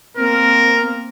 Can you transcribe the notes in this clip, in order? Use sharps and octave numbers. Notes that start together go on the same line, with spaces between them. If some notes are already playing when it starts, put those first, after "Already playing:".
A#3 C4 A#4